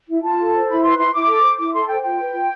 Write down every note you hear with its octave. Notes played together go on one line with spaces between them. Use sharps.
E4
F4 A5
A4
C5
E4 B5
B4 C6
E4 C6
E4 D6
A4
C5
E4 D6
A4 C6
C5 G5
F4 G5
B4
F4